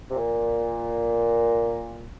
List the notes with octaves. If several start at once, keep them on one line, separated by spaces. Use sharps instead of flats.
C3
A#2